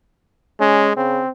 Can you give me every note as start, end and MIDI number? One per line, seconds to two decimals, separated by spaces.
0.60 0.93 56
0.60 0.90 61
0.97 1.20 49
0.97 1.29 60